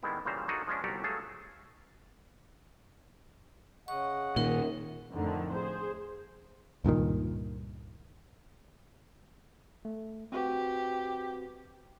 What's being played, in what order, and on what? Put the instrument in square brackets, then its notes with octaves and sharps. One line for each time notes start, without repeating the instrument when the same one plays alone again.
[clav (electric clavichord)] D#3 G3 G#3 B3 C4 E4
A#2 C#3 E3 G3 C5 A#5
A#3 D4 D#4 F#4 G#4 A4
F3 G#3 C#4 D4
G1 C2 F#4 G4 A4 A#5
F#3 A3 G#4 A4 F5 A5
[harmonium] C#3 D#5 F#5 [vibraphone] C#6
[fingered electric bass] A#2 D#3 [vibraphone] D#4 A#4
[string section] F2 A2 D3 D#3
G#4 C5
[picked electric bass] C#2 G2 A#2 D#3
[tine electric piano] A3
[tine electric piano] C4 F#4 B4 [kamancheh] G4